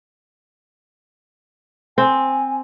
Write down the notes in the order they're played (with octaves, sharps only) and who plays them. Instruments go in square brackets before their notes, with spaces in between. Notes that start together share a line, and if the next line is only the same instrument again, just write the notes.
[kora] C4 [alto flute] G#5